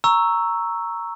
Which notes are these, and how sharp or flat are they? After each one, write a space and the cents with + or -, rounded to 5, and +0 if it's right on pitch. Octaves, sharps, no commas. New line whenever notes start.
A#5 +0 C#6 +0 E6 +0